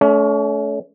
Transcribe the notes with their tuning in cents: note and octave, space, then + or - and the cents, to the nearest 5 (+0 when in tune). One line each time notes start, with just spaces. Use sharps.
A3 -25 C#4 +35